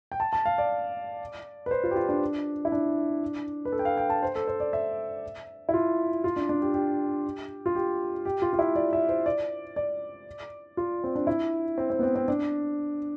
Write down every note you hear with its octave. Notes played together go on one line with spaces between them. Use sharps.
G5
A5
A5
F5
D5
B4
C5
F4
G4
F4
D4
E4
D4
B4
A4
G5
F5
G5
A5
C5
A4
C5
D5
E5
E4
F4
F4
D4
D4
G4
G4
F4
G4
G4
F4
F4
E4
D5
E5
C5
D5
D5
F4
C4
D4
E4
C4
C4
B3
C4
C4
D4